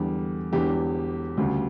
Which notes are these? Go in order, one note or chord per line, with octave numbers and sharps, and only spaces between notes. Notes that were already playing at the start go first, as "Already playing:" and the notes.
Already playing: E2 D3 G3
E1 E2 D3 G4
D2 C#3 G3